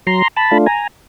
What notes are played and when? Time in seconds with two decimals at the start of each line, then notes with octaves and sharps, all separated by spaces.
0.07 F#3 A#5 C6
0.37 A5 B5
0.51 A3 D4 F4
0.66 G#5 A#5